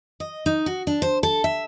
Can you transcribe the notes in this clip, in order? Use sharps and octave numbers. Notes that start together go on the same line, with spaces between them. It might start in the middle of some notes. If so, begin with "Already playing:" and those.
D#5
D#4
F#4
D4
C5
A4
E5